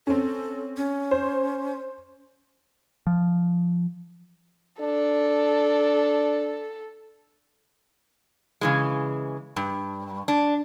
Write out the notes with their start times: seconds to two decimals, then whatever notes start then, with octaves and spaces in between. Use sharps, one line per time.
0.07 C4 C#4 A4
0.77 C#4
1.11 C5
3.07 F3
4.81 D4 A4
8.61 C#3 E3 G#3
9.56 G2
10.28 D4